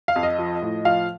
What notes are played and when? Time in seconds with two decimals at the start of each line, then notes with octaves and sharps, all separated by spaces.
0.08 F5
0.16 F2
0.23 D#5
0.38 F3
0.62 A2
0.85 F3 F5